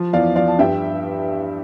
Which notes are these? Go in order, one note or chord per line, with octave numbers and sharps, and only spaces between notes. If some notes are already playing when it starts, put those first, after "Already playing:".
Already playing: F3
E2 D5 F5
F3 D5 F5
A5
G2 E5 G5